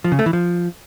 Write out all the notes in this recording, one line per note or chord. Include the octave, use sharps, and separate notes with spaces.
F3
C#3
A3
E3
F3